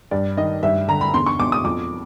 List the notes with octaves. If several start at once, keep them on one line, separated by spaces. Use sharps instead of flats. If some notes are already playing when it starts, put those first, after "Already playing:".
G2 D5
D#3 D#5
G2 E5
D3 A#5
B5
E2 C6
C#6
B2 D6
D#6
F2 D6